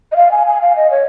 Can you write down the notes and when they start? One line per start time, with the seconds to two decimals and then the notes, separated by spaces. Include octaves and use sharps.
0.12 D#5
0.16 F5
0.31 G#5
0.47 G#5
0.61 F5
0.76 D#5
0.91 C#5